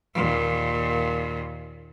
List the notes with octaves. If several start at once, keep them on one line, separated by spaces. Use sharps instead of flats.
D#2 A#2